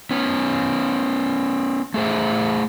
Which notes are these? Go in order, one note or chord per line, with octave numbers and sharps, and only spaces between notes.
B3 C#4
A3 G#4 C5 E5